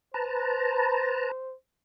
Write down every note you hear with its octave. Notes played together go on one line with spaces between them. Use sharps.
B4 C5 A5 A#5